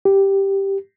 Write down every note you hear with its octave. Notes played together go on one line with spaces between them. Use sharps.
G4